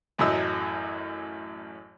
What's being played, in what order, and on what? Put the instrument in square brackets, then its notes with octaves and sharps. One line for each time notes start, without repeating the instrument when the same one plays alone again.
[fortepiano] A1 F#2 A2 F#3 D#5 E6